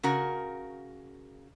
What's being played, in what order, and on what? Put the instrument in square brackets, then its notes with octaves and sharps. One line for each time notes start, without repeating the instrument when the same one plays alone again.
[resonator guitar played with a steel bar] C#3 F#4 A#4